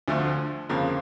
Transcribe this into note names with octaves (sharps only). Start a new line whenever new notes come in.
D2 D3 F3 A3
G1 F2 C#3 F3 A#3